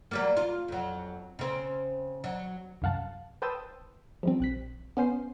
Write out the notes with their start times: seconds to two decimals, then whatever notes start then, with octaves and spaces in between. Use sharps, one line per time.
0.11 F#3 G3 A#3
0.37 F4
0.68 F2 F#3
1.39 C#3 C4
2.24 F#3
2.82 C2 F#2 F5 F#5 A5
3.42 B4 C5 G5 A5 D#6 E6
4.23 F3 G3 C4
4.40 A#1 F#6 B6
4.97 B3 C#4 C5 C7